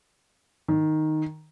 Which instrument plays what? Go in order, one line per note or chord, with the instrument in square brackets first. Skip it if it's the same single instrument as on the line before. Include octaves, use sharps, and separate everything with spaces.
[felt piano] D#3